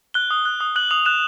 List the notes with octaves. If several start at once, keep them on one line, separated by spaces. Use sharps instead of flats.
F#6 G7
D#6
F#6
D#6
F#6 F#7
D#6 F7
F#6 E7